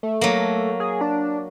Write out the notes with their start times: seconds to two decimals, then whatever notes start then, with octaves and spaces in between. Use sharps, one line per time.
0.03 A3
0.21 F#3 A#3
0.80 G#4
1.01 D4